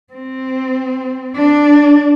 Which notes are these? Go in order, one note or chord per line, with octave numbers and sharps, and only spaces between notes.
C4
D4